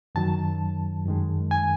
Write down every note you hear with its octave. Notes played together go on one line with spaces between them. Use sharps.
F#2 D#3 F#3 A5
F#2 D#3 G#3
G#5